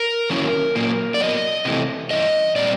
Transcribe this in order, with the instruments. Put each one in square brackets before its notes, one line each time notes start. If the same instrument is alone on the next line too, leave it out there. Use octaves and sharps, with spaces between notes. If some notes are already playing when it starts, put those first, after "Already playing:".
Already playing: [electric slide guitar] A#4
D#3 F#3 A#3 C#4 E4
A#2 F#3 A#3
D5
A2 F#3 B3 D#5
C3 E3 A3
G2 E3 C#4 E4 D#5
A#2 G3 C4 D5